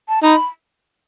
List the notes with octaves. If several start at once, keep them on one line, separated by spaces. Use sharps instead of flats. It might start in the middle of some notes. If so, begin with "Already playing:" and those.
A5
D#4 B5